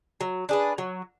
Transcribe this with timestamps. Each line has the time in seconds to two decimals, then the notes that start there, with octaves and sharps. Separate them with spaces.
0.21 F#3
0.49 D4 G#4 B4
0.78 F#3